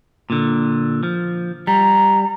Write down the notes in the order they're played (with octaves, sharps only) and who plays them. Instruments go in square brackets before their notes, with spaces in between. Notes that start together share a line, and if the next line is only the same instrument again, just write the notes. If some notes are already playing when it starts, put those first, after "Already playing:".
[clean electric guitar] A#2 D3
F3
[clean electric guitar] G3 [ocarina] A#5